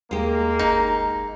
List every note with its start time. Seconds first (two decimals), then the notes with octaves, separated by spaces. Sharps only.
0.11 D#2 G#3 A#3 G4
0.59 G1 D#4